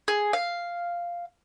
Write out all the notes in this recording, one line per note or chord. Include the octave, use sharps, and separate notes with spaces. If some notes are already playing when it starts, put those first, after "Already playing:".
G#4
F5